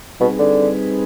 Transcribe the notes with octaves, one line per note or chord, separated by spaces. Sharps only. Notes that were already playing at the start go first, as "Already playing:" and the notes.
B2 G3 C4 D#4 G#4 B4
D3